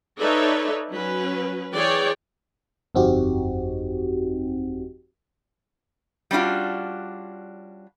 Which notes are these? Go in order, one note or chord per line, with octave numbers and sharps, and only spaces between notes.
D#4 A4 B4 C#5 D5 E5
F#3 C#4 B4
E3 G#4 C#5 D5 G5
G1 F2 C4 D#4 F#4 G4
G3 C#4 D4 F4 F#4